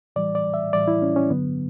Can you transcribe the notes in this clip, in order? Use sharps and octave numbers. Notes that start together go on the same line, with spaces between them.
A2 E3 G3 D5
D5
E5
A2 E3 G3 D5
E4
C#4
C#4
G2 D3 F#3 B3